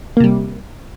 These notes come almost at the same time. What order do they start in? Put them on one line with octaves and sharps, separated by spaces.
A#3 C3 G3